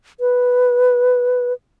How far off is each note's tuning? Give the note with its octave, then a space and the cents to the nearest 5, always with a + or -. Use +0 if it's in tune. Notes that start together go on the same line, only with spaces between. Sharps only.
B4 +0